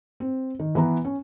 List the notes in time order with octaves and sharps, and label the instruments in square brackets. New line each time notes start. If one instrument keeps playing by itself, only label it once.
[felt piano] C4
D#3
E3 B3 B4 A#5
C#4